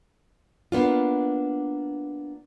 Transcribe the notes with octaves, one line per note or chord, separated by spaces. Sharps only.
A#3 B3 D4 F4